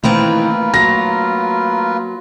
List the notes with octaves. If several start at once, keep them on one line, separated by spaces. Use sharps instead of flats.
D#3 E3 A3 A#3 C4 F4 A#4 B4
F#3 A#6